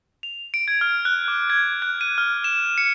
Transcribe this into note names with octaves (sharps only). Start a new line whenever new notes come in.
F7
D7
G#6
F6
F#6
D6
G#6
F#6
D#7
F6
E7
C#7